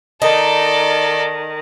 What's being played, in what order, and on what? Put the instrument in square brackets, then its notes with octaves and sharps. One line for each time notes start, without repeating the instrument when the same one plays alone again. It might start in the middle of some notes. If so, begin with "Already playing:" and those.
[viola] D#3 [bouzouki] D#4 [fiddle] A4 D5